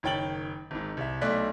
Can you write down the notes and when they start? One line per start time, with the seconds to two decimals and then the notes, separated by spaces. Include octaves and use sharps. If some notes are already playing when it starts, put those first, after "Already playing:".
0.03 F#1 D#3 C#5 G5 A6 F#7
0.71 G#1 G#2
0.97 C2 E5
1.21 B1 A3 D5 F#6 B6